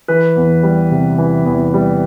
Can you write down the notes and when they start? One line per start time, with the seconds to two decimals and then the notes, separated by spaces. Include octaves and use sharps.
0.08 E3 B4
0.36 E2
0.63 G3
0.91 C3
1.18 E3
1.46 E2
1.74 G3